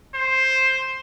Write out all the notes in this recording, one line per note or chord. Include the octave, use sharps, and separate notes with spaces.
C5